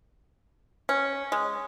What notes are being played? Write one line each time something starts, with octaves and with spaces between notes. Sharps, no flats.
C#4
G#3